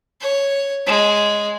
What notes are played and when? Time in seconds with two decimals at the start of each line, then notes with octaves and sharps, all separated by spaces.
0.21 C#5
0.86 G#3